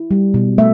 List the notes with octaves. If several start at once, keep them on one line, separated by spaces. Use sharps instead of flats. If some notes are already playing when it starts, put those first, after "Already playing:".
Already playing: E4
G3
B2
A3 E5